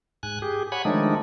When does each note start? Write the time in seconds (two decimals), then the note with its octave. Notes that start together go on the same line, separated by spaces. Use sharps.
0.23 G#2 G#5 F#6
0.42 G4 G#4
0.72 C#5 F#5 G#5 B5
0.85 D#3 F3 G#3 A3 D4 D#4